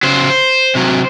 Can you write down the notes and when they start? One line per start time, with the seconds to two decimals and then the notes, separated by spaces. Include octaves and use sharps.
0.03 C#3 F#3 C5
0.75 C3 F#3